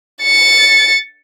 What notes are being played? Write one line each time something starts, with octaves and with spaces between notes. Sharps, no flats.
A6 C#7